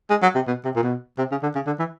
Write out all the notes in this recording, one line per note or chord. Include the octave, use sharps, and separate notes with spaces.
G#3
F#3
C3
B2
C3
A#2
B2
C3
C#3
D3
C#3
D3
E3